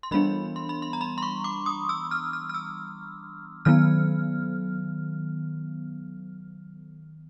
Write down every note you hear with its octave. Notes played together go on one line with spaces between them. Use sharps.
C6
E3 G3 B3 D4 B5
C6
B5
C6
A#5
B5
C6
C#6
D6
D#6
E6
F6
F6
F6
E6
D#3 F#3 B3 F6